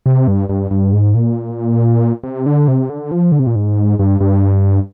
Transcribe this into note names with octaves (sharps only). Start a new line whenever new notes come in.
C3
G2
G2
G2
G#2
A#2
C3
D3
C3
D3
F3
D3
C3
A#2
G#2
G2
G2